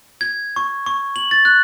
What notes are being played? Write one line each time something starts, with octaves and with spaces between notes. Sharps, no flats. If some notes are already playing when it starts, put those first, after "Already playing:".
G#6
C#6
C#6
F#7
A6
F#6